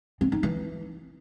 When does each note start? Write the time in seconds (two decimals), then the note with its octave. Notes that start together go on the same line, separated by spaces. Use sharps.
0.21 C4
0.32 D#4
0.43 E3